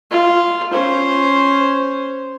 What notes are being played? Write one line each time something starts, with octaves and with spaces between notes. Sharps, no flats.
F4
C#4 C5